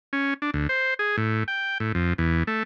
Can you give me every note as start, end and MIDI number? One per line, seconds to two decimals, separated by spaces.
0.13 0.34 61
0.42 0.51 62
0.54 0.67 38
0.69 0.94 72
0.99 1.16 68
1.18 1.44 45
1.48 1.78 79
1.80 1.92 45
1.95 2.13 41
2.18 2.43 40
2.47 2.63 57